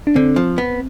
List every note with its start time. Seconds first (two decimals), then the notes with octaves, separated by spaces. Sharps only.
0.07 D4
0.15 D3 C4
0.36 F3
0.58 B3